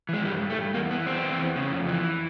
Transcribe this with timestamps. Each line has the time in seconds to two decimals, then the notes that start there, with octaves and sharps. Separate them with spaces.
0.09 E3 G#3
0.25 G2 G3
0.41 G2
0.50 A3
0.57 G2
0.74 E2 A#3
0.91 E3 B3
1.06 E2 C4
1.24 E3
1.40 E2
1.56 C#3
1.72 F2
1.88 E3